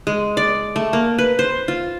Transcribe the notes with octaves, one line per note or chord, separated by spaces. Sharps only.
G#3
D5
A3
A#3
B4
C5
F4